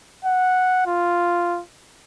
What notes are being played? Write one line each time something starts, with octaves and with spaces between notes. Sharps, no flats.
F#5
F4